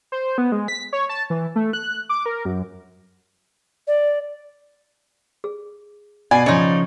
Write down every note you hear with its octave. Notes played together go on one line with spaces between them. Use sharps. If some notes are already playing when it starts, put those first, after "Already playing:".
C5
B3
G#3
B6
C#5
A5
E3
A3
F#6
D6
A#4
F#2
D5
G#4
B2 D5 F#5 G#5 B5 C7
C#3 F3 D#4 G#4 C#5 D#5 C6